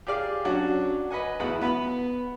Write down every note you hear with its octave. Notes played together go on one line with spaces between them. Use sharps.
G4 G#4 D5 F5
F#3 C#4 D4 F#4
B4 D#5 F#5 G#5
E2 B3 E4 F#4 F#5 B5
B3 B4 B5